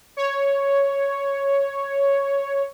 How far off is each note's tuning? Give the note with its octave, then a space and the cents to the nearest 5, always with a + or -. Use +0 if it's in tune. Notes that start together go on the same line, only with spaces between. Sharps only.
C#5 +0